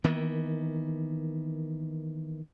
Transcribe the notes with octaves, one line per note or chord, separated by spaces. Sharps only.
D#3 E3 A#3 B3